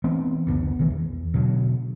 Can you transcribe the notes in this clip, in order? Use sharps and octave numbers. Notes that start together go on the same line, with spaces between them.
E3 A3 B3 C4
F#1 D2 B3
B1 D#3 E3 A3
E2
B2 D3 F#3